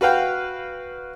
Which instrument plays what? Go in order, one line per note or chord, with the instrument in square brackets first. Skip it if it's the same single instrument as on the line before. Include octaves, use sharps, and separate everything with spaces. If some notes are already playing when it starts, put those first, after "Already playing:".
[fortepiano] F#4 B4 F5 G5